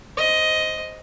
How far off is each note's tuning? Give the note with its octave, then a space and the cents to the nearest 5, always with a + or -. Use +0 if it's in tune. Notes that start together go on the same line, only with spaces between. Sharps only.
C5 +0 D#5 +10